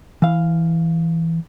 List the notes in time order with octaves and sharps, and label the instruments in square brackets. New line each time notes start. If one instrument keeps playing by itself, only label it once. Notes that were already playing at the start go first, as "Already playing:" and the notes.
[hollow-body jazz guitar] E3 F5